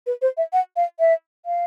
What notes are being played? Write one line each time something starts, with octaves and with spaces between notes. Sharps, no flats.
B4
C5
E5
F#5
F5
E5
F5